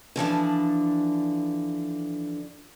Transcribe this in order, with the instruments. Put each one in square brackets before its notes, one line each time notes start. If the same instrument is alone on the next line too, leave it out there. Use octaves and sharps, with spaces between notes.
[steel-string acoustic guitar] D3 E3 F3 D4